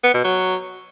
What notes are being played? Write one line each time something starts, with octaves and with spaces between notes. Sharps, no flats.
B3
B2
F#3